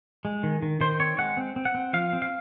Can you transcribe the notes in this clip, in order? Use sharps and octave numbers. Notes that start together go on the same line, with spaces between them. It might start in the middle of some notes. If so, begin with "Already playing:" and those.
G#3
D#3
D#3
D#3 C5
C4 C#5
G#3 F#5
C4
C4
F#5
C4
F3 F5
C4
F5